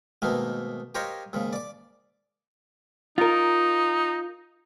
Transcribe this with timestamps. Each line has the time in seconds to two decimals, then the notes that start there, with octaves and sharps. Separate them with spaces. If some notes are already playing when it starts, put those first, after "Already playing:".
0.22 G#2 B2 D#3 A3 A#3
0.95 G4 A#4 C5 C#5 D#5 F5
1.33 D#2 G#2 C#3
1.53 D5 D6
3.18 D#4 F4 A#4